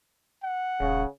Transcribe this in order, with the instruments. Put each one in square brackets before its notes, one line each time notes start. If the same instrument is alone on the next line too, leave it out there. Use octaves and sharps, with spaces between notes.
[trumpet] F#5
[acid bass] D#1 [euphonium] C#3